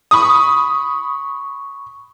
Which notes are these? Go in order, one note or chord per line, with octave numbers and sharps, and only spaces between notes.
B5 C#6 D#6